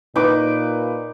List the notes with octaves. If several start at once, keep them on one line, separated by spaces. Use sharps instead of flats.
A#2 D#4 B4 D6